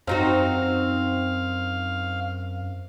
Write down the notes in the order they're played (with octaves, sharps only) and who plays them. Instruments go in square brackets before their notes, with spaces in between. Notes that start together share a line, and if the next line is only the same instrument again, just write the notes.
[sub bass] F#2 [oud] C4 D#4 F#4 [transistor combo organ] F5